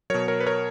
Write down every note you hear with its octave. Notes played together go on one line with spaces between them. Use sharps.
B2 F#3 A#4 C#5
A#4 C#5
B4
A#4 C#5